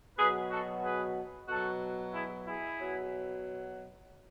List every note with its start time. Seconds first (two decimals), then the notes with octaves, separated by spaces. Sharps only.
0.18 B2 F#3 G#4 B4
0.51 F#4 A4
0.83 G#4 B4
1.49 B2 F#3 F#4 A4
2.14 E4 G#4
2.47 E4 G#4
2.80 B2 F#3